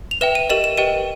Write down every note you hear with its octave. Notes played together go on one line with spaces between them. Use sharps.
F7
B4 E5 G5 E7
D#7
G4 A#4 D#5 E7
E7
G4 B4 D#5 G5 D#7